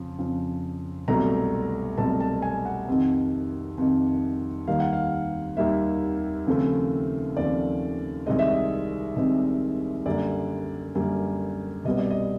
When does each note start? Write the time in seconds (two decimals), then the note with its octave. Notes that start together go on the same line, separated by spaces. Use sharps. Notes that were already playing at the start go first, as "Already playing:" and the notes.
Already playing: F2 C#3 F3
0.18 F2 C#3 F3
1.08 C2 B2 F#3 A3 C4 A#5
1.98 C2 B2 F#3 A3 C4 A5
2.20 A5
2.42 G#5
2.66 F#5
2.88 F2 C3 D#3
3.78 F2 C3 D#3
4.67 D#2 D#3 G3 A#3 F5
4.80 F#5
4.93 F5
5.57 D#2 D#3 G3 A#3 E5
6.47 D#2 C#3 F3 A3 C4
7.37 D#2 C#3 F3 A3 C4 D5
8.26 C2 C3 D#3 G#3 C4 D#5
8.39 E5
8.51 D#5
9.16 C2 C3 D#3 G#3 C4
10.06 F#2 D3 G3 A#3 D5
10.95 F#2 D3 G3 A#3
11.85 C2 B2 G3 B3 D#5
11.98 D5
12.11 D#5